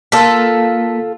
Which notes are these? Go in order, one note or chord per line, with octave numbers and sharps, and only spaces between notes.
A#3 F4 A4 B6